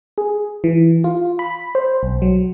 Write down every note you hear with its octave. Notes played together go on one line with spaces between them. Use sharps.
G#4
E3
F4
B5
C5
B1
F#3